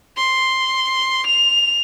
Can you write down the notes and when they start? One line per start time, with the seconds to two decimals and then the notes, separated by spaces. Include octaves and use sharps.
0.17 C6
1.27 F7